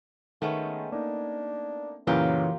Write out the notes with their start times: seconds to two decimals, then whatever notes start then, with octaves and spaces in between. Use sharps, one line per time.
0.42 D#3 G#3 A3 B3 C#4
0.92 A#3 D4 D#4
2.07 F#2 A#2 C#3 E3 F#3 A#3 F4 G4